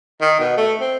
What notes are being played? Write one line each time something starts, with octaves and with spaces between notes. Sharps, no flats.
D#3
B2
A3
C4